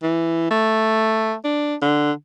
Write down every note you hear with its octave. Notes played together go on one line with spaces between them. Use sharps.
E3
A3
D4
D3